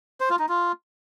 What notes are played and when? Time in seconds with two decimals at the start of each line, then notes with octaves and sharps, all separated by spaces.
0.20 C5
0.30 F4
0.39 D#4
0.49 F4